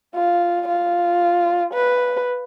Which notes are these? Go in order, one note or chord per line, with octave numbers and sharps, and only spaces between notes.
F4
F4
B4